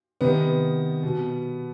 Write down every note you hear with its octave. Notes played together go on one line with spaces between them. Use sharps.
C3 D#3 B3
B2